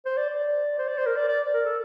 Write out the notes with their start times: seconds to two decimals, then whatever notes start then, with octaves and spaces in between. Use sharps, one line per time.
0.06 C5
0.17 D5
0.29 D5
0.79 C5
0.88 D5
0.98 C5
1.06 A#4
1.16 D5
1.28 D5
1.54 A#4
1.65 A4